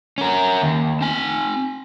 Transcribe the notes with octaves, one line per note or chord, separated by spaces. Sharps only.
C#4 A#4
D#2
C4 G#5